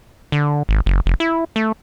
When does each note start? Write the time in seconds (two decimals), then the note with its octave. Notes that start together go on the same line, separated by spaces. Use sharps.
0.32 D3
0.69 G#1
0.86 F#1
1.06 F1
1.20 E4
1.56 A3